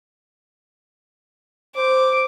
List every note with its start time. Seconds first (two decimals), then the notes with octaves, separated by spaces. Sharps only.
1.76 C5 D6